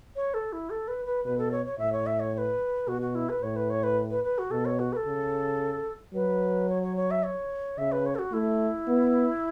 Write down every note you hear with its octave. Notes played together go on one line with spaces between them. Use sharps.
C#5
A4
E4
A4
B4
B4
B2 B4
A4
C#5
C#5
A2 E5
C#5
E5
C#5
C#5
B4
B2 F#4
F#4
E4
B4
A2 C#5
B4
C#5
B4
B4
B4
F#4
B2 A4
C#5
F#4
B4
A4
C#3
F#3 B4
C#5
C#5
C#5
E5
C#5
C#3 E5
B4
C#5
A4
F#4
A3 E4
B3